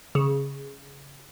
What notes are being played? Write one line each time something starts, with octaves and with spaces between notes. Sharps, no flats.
C#3